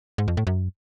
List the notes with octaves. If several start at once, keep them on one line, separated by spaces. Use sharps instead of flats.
G#2
F2
A2
F#2